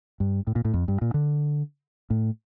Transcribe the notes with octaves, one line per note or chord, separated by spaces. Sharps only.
G2
A2
A#2
A2
F2
G2
A#2
D3
A2